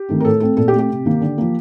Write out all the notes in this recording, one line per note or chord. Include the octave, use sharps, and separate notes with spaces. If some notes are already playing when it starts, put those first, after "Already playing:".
Already playing: G4
D#3 A3 C4
A#4
A2 A4
A3 C4 A4
A#2 A4
G4
A3 C4
G4
C3
D#3 A#3
D3
F3 A#3